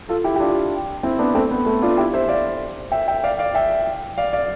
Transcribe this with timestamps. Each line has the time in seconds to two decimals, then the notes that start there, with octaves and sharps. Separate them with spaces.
0.09 F4 A4
0.24 E4 G4
0.36 G4
0.40 D4 F4
1.03 C4 E4
1.19 B3 D4
1.35 A3 C4
1.51 B3
1.66 A3
1.82 D4 F4
1.98 E4 G4
2.14 C5 E5
2.29 D5 F5
2.92 E5 G5
3.08 E5 G5
3.24 D5 F5
3.39 D5 F5
3.55 E5 G5
4.18 D5 F5
4.33 D5 F5